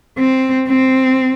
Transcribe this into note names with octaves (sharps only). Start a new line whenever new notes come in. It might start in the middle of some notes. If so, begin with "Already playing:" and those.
C4
C4